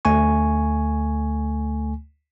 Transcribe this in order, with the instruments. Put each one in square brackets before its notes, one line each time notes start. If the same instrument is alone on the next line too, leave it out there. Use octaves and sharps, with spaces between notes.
[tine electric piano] D2 A3 G#5 C#6